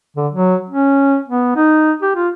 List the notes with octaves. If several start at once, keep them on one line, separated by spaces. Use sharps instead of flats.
D3
F#3
C#4
B3
D#4
G4
F4